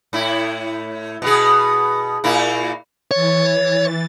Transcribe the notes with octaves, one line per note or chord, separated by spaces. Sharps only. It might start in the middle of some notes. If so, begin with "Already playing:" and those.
A2 E4
B2 B3 G#4
A#2 A#3 E4
E3 C#5 A6